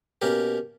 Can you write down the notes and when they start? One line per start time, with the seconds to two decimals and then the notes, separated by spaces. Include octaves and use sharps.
0.22 B2 A#3 C#4 G4 A#4